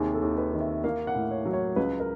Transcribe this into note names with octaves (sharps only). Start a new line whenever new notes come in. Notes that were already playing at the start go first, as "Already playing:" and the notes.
Already playing: D#2 C3 D#3 G#4
A4
D#2
B4
D#3
E5
A#3 F5
F#5
A2
C#5
F#3
C#5
C#2 B4
A#4